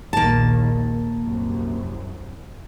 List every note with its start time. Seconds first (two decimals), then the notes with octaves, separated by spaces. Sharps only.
0.13 A#1 D#2 D#3 A#3 A5
1.23 C2 F#2